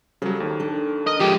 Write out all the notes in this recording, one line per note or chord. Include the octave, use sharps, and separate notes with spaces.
C#3 F#3 G3 A4 C5
D#2 D#3
D4 A4
A#4 D#5
A2 D3 F3 G#3 G4